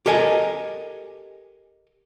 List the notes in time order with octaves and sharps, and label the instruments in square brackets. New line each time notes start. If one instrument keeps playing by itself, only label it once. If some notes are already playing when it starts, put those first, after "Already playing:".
[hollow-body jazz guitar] G4 A4 A#4 D#5 G#5